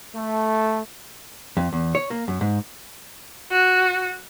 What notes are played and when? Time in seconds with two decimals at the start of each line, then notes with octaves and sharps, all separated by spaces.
0.15 A3
1.57 F2
1.73 E2
1.95 C#5
2.10 A#3
2.28 F#2
2.41 G#2
3.51 F#4